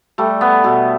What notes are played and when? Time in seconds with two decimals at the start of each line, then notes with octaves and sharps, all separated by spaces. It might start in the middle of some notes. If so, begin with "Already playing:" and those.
0.18 G3 A3
0.41 B3
0.64 B2 A3